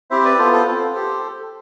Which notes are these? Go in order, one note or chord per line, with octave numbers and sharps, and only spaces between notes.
C4 E4 G4 C5 E5
B4 D5
B3 F4 A4 C5
A4 C5
C4 F4 A4 C5
G4